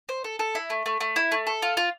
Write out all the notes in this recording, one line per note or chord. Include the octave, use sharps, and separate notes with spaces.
C5
A4
A4
E4
A3
A3
A3
E4
A3
A4
F4
F4